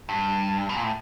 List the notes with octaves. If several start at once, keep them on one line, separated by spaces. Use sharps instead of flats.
G2
B2
A#2
A2